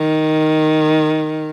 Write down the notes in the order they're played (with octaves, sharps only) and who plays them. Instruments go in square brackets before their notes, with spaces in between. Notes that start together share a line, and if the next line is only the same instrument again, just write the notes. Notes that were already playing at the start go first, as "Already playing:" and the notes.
Already playing: [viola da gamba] D#3